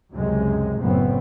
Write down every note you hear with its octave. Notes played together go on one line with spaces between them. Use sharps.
C#2 F#2 C3 G#3
F#1 F#2 A2 B3 C4